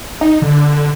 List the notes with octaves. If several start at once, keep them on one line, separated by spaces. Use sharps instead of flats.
D#4
D3